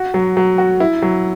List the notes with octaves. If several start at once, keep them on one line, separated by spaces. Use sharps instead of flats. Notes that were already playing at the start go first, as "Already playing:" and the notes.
Already playing: F#4
F#3
F#3
F#4
E4
F#3